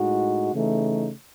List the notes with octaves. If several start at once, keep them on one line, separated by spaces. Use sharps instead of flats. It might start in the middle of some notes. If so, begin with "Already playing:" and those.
Already playing: A2 G#3 D#4 F#4
C#3 E3 A3 D#4